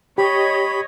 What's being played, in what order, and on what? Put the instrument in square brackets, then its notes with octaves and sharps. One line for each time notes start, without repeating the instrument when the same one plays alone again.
[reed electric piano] G4 [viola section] C#5 D#5 [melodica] B5